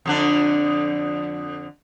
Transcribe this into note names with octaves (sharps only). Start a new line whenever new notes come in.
F2 D3 D4